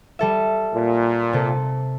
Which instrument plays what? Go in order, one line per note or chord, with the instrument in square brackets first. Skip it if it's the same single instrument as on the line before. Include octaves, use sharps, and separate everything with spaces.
[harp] G3 A4 E5
[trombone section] A#2
[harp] C3 A4